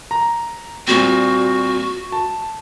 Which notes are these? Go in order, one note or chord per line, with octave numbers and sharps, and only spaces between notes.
A#5
A#2 G3 C4 F#4
A5